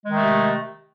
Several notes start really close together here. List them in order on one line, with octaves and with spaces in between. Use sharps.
G#3 D#3 A3 C3